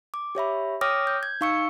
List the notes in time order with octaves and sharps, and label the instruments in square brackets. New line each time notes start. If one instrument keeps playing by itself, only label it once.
[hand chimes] D6
G4 C#5 E5 B5
C#5 G5 D6 D#6 F6 A#6
G6
G#6
D#4 F5 C#6 E6 C#7